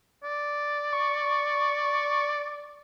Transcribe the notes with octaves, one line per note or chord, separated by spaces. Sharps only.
D5
C#6